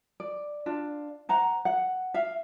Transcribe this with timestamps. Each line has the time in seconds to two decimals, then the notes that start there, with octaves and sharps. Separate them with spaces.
0.20 D5
0.66 D4 F4
1.29 C5 F#5 A#5
1.65 F#5
2.14 E5 F5